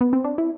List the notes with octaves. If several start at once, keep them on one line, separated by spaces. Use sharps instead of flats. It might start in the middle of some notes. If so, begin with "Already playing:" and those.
B3
C4
D4
E4